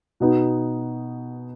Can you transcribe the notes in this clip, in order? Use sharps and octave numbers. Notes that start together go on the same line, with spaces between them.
B2 B3 D#4